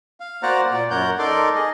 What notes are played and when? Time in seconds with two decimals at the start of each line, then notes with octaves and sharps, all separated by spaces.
0.20 F5
0.43 A#3 F#4 C5 D5 F#5 A#5
0.71 A#2 D5
0.90 F#2 A#4 C#5 F#5 G6
1.19 D#4 A4 A#4 D5 C6 D6
1.55 G#4 D#5